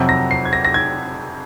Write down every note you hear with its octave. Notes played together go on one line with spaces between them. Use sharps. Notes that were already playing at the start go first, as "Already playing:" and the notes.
Already playing: F2 C3 F#3
A#6
C7
G#6
A#6
A#6
G#6